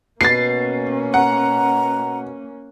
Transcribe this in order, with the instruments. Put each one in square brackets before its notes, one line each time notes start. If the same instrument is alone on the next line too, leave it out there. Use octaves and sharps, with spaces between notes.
[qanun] B2 B4 [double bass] A#3 C#4 [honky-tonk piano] A6 C7
[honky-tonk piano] F#5 [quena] A#5